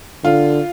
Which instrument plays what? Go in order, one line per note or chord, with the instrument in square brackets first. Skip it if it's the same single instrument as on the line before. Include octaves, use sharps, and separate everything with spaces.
[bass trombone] D3 [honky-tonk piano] F4